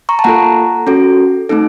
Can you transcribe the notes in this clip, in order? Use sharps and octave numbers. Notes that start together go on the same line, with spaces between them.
A#5 C#6
A5
A#3 F4 A4 F#5 A#5
C#4 F#4 A4
A3 C4 D#4 A4